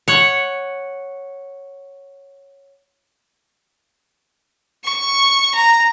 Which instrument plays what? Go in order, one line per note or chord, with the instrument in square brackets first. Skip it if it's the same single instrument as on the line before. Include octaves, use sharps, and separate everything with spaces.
[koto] C#5 F#5
[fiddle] C#6
A#5